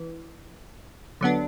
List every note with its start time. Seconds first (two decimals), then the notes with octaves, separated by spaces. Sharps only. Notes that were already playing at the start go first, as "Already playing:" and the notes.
Already playing: E3
1.21 D3 F#3 B3 D4